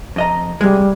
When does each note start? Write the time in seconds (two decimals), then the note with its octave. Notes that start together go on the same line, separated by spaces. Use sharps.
0.16 F2 D#5 A#5
0.61 C3 G3 G#3